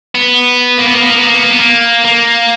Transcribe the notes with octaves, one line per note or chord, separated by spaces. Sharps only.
B3
A#3
B3
A#3
B3
A#3
B3
A#3
B3
A#3
B3
A#3
A#3